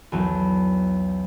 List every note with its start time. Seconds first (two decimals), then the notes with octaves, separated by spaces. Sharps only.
0.12 B1 E2 F#3